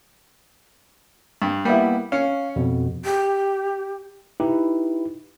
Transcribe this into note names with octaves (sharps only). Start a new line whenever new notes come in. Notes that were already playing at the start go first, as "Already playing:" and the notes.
G2
G3 A#3 B3 E4
C#4 F5 C#7
F2 B2
G4
D#4 E4 G4 B4